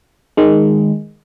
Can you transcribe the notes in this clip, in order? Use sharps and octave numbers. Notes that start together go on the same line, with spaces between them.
D#3 G#3